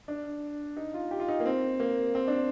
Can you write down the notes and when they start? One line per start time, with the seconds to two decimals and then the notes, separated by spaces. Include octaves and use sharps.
0.08 D4
0.77 D#4
0.94 F4
1.11 G4
1.20 F4
1.28 D#4
1.40 A#3
1.46 C4
1.80 A#3
2.15 C4
2.28 D4